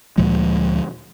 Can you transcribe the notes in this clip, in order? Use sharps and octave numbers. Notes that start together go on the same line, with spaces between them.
D2 A#2 F3 G#3